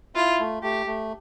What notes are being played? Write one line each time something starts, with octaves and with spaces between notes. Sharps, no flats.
E4 F4
A3
A3 G4
A3